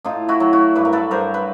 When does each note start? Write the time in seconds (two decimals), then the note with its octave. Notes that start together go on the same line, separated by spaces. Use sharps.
0.05 A2 D#4 F4
0.29 E4 F#4
0.40 F#3
0.53 E4 F#4
0.75 G2 B4
0.85 A#4
0.93 A4 B4
1.11 G2 A#4 C5
1.34 B4